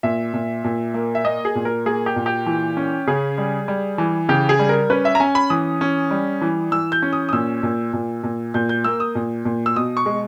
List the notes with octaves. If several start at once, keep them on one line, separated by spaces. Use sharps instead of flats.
A#2 E5
A#2
A#2
A#3
E5
A#3 D#5
G#4
A#2
A#4
A#3 G#4
G4
A#2
G4
E3
C#4
C#3 G#4
G3
G3
E3
C#3 G4
G#4
G3
A#4
C#4 B4
E5
A#5
C#4 G#5
B5
E3 D#6
C#4
G3
E3
E3 E6
G6
C#4
D#6
D#6
A#2 E6
A#2
A#2
A#2
A#2 G6
G6
A#3 E6
D#6
A#2
A#2
E6
B2 D#6
C#6
G#3